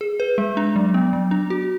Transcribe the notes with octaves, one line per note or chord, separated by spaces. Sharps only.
G#4
B4
G#3
D4
F#3
B3
F#3
D4
F#4